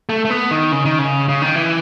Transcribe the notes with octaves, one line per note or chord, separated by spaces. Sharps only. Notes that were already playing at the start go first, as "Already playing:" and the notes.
A3
A3
B3
D#3
C#3
D#3
C#3
C#3
D#3
E3